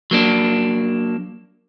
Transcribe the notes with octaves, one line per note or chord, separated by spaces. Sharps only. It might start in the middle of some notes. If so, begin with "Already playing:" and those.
F#3 A#3 D4